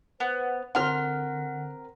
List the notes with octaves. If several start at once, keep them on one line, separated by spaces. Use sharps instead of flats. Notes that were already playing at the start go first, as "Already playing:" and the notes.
B3 C5
D3 C4 A#4 F#5 C6 F6